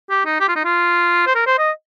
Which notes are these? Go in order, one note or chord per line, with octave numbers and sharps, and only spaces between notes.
G4
D#4
G4
F4
D#4
F4
C5
A#4
C5
D#5